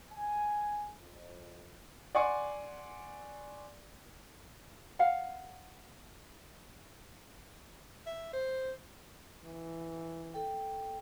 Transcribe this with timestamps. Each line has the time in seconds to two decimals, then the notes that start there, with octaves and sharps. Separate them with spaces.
0.13 G#5
0.97 F2
2.15 D5 F#5 G#5 C6 C#6
4.99 F5 F#5
8.06 E5
8.33 C5
9.45 E3
10.34 A4 G5